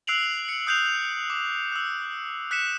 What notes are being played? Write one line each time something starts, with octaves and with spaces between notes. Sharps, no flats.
E6 F#6 C7 D7 F7 F#7
C#7
D#6 F#6 G6 C7 F7
D6
E6 F#6
F#6 B6 C#7 E7